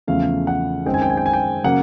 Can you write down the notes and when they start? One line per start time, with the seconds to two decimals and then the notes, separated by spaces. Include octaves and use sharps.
0.07 E2 C#3 F3 A3 F5
0.47 F#5
0.86 F#2 D#3 G#3 C4 G5
0.94 G#5
1.02 G5
1.10 G#5
1.17 G5
1.26 G#5
1.33 G5
1.64 C#3 F#3 A#3 F#5